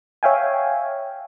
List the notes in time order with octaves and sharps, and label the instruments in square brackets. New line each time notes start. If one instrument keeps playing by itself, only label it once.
[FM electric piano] C#5 E5 F5 G5 G#5